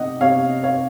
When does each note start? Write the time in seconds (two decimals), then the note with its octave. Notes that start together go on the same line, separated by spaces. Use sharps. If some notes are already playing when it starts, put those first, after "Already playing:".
Already playing: C3 D#4 D#5 F#5
0.20 C3 C#5 F5
0.49 D#4
0.63 C#5 F5